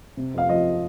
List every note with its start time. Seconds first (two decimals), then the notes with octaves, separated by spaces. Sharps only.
0.17 C3
0.34 F2 F5
0.49 F3 D#5